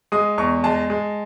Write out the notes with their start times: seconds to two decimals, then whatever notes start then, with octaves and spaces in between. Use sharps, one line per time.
0.12 G#3 D#6
0.38 E2 C#6
0.64 G#3 A5
0.90 G#3